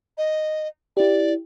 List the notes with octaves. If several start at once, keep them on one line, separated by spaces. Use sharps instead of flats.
D#5
E4 G4 D5